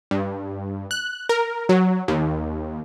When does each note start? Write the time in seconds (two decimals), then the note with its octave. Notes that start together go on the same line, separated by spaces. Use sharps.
0.11 G2
0.91 F#6
1.29 A#4
1.69 F#3
2.08 D#2